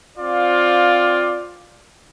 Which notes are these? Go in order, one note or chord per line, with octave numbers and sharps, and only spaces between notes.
C4 F4 D5 F5